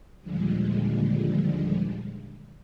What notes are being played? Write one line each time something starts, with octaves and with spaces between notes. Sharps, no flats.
D#2 A#2 D3 F3 G3 G#3